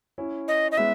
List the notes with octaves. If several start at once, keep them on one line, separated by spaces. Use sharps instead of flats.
C#4 E4
D#5
D#5
G#3 B3 E5